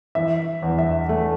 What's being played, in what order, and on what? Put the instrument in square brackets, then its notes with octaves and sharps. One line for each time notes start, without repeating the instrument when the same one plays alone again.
[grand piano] E3 E5
E2
E5
A3